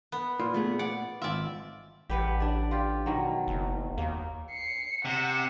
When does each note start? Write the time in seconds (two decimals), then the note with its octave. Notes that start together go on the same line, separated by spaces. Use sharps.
0.12 B3
0.40 A#2 F4
0.54 A3 B3 G#4
0.79 D5 F#5
1.22 G#1 F4 D5 E5
2.10 A1 G4 B4 F#5
2.40 D4 D5
2.71 F4 G4
3.06 B2 D#3 F#3
3.47 F#1
3.98 D#2 A#3
4.51 C7 C#7
5.05 C3 F#5 E7